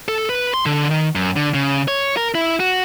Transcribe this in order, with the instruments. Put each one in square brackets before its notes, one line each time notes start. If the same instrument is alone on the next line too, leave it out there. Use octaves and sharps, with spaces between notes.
[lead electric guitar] A4
B4
C6
D3
D#3
F#2
D3
C#3
C#5
A#4
E4
F#4